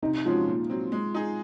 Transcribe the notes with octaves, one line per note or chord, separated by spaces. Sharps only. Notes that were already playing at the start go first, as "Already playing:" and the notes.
C3 D#4
F3 G#3 C#4 F4 F#4
A#2
F#3 C4
G#3
D#4 G#4